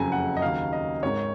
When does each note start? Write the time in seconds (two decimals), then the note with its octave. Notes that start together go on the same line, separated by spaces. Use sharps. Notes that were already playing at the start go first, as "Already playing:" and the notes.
Already playing: F#1 F2 C#3 F#3 G#5
0.12 F#5
0.37 D#5
0.42 D#2 C#3 F#3 F5
0.73 D#5
1.03 G#1 G#2 D#3 C#5